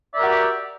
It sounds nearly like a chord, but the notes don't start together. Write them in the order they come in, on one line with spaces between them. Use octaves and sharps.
D5 E5 A#4 G4 F#4